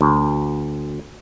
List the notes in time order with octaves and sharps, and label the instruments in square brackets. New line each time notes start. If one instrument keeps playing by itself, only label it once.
[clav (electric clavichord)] D2